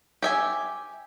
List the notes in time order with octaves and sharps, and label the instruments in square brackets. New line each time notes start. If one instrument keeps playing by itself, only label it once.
[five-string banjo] G4 E5 G#5